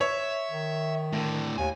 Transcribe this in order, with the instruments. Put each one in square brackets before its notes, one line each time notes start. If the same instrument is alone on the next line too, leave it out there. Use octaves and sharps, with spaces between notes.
[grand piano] C#5 [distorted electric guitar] E5
[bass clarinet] D#3
[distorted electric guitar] A2 D3
[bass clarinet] D#2 [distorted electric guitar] G#5